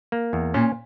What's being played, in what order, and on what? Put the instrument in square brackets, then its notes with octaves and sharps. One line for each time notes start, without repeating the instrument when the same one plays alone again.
[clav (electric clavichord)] A#3
E2
[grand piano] A#2 [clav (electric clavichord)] C#4